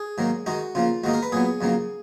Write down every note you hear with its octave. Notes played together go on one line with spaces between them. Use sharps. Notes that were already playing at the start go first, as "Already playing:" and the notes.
Already playing: G#4
G#2 D#3 F#3 A#3
D#3 G#3 D#4 F#4
C#3 F3 A#3 F4
G#2 D#3 A#3 D#4 F#4
A#4
B4
A#2 F#3 B3 G#4
F2 C#3 F#3 A#3